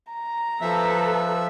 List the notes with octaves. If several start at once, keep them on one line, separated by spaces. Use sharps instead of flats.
A#5
F3 A4 B4 E5